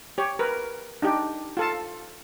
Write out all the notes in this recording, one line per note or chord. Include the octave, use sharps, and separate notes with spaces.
G4 C#5
A#4 B4
D4 D#4 G4
F4 A4 A5